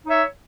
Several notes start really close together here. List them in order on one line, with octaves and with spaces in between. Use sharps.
D#4 C#5 E5